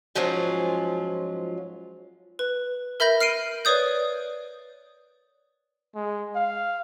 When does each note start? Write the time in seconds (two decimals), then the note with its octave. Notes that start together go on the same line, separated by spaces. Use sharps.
0.15 G#2 F3 F#3 C#4 F4
2.39 B4
3.00 A#4 E5 B5 G6 A#6
3.20 F6 C7 D7 D#7
3.65 B4 C#5 D5 D#6 G6
5.95 G#3
6.35 F5